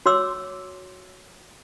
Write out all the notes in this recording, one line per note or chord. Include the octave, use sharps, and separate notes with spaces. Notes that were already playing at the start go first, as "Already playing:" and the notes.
F#4 C#5 C6 D6 E6